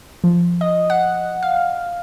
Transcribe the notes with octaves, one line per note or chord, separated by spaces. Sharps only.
F3
D#5
F#5
F5